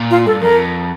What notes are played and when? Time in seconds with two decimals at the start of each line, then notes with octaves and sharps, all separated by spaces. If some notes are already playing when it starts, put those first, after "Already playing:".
Already playing: A#2
0.11 F4
0.26 G2 A4
0.41 F2 A#4